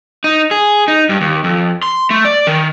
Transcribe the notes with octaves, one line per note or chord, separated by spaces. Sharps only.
D#4
G#4
D#4
G2
D#2
F2
C6
A3
D5
D#3